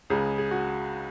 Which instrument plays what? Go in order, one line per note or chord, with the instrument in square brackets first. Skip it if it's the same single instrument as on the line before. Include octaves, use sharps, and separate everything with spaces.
[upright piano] C#2 C#3 G#3 G#4
G#4
F#4